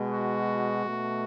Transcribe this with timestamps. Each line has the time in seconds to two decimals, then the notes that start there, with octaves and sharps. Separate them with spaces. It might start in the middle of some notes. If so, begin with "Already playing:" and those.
Already playing: B2 G#3
0.13 F#4
0.85 B2 A3